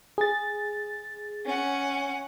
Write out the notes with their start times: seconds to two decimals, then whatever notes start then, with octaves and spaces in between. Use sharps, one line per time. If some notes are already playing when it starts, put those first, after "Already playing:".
0.18 G#4 A6
1.45 C#4 F#5